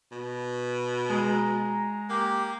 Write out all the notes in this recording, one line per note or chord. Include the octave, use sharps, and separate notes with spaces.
B2
G#3 A#5
A#3 G4